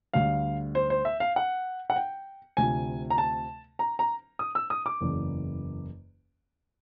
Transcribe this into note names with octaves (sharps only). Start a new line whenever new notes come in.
D2 D3 G3 F5
C5
C5
E5
F5
F#5
F#5
G5
D2 C3 F3 G#5
A#5
A5
A#5
A#5
D#6
E6
D#6
D6
F#1 E2 C#3